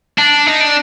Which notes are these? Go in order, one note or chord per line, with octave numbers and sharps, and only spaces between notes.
D4
D#4
D4